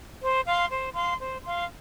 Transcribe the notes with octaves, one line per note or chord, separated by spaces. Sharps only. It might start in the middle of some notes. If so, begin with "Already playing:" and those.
C5
F5 C6
C5
F5 C6
C5
F5 C6